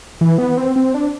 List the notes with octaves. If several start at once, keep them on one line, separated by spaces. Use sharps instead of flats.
E3
B3
C4
C4
D4